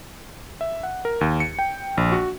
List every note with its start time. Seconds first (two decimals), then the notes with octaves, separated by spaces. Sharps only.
0.61 E5
0.83 F#5
1.05 A#4
1.21 D#2
1.40 C#7
1.59 G5
1.97 A#1
2.12 F#4